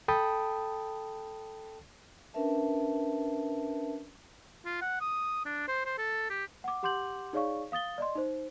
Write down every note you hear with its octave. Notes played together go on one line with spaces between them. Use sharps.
A4 G5 A5 B5 D#6
C#4 D4 A#4 B4 E5 A5
F4
F#5
D#6
D4
C5
C5
A4
G4
F#5 D6
G4 F#5 C6 D6 G6 F#7
D#4 G#4 C#5 D5 F5 C#6
F5 D#6 A6 G7
D5 D#5 C6
D#4 C5